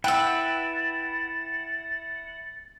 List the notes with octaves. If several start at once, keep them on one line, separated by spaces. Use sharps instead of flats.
E4 B4 F#5 G5 E6 A6